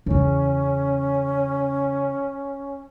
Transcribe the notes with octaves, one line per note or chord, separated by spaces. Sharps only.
E2 C#3 C#4